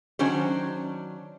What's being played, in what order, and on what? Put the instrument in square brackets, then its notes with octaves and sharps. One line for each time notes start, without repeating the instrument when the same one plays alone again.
[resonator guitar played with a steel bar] D#3 F#3 C#4 D4 C5 C#5